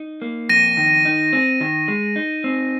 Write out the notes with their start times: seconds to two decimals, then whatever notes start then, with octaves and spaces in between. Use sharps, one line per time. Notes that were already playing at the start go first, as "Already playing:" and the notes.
Already playing: D#4
0.22 A#3
0.49 F2 A#6 D#7
0.77 D#3
1.05 D#4
1.33 C4
1.61 D#3
1.88 G#3
2.16 D#4
2.44 C4